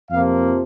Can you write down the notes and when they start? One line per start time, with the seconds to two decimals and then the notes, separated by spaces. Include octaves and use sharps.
0.11 F2 C3 F3 A#3 F5